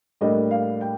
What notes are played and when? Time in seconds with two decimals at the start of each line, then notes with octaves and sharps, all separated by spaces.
0.21 A2 G3 A#3 D4 D#5
0.51 F5
0.81 G5